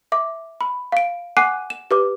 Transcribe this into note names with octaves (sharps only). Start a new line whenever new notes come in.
E5 D6
B5
F5 D7
F#5 G#5 D6 F#6 C7 D#7
E7
G4 B4 D6